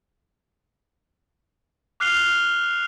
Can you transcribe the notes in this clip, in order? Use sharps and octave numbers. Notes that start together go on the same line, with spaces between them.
D6 F6 F#6 C7 F7 G7